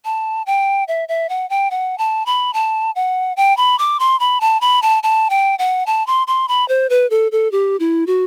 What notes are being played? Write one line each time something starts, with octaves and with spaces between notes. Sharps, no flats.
A5
G5
E5
E5
F#5
G5
F#5
A5
B5
A5
F#5
G5
B5
D6
C6
B5
A5
B5
A5
A5
G5
F#5
A5
C6
C6
B5
C5
B4
A4
A4
G4
E4
F#4